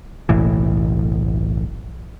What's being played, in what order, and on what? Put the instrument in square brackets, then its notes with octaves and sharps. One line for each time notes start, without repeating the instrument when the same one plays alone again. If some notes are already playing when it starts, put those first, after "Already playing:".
[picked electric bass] F#1 B1 A2 E3